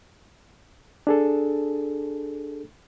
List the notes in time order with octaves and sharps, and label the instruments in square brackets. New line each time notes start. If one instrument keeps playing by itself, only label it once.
[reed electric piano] D4 G#4 A4